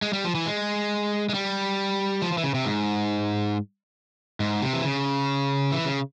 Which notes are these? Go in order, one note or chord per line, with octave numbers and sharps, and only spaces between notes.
G#3
G3
F3
E3
G#3
G#3
G3
F3
F3
E3
C#3
C3
G#2
G#2
C3
E3
C#3
E3
C#3